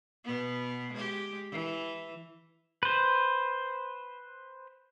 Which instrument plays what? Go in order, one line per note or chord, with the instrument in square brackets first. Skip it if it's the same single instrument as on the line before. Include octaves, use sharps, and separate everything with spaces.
[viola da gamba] B2 B3
G#3 G4
E3
[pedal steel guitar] B4 C5